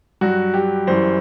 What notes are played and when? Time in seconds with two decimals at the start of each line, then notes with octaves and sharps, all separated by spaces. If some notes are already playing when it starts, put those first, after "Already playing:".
0.21 G2 F#3 F#4
0.54 G4
0.87 F#2 E3 G3 C5